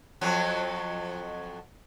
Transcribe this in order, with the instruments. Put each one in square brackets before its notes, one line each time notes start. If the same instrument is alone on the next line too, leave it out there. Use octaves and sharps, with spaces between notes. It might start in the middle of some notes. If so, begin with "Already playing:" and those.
[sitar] F2 F3 F#3